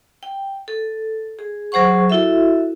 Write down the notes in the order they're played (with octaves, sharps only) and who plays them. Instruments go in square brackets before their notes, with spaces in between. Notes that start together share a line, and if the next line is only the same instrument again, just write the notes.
[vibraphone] G5
A4
G#4
F#3 G#4 C5 F#5 C#6
E4 F#4 A4 E5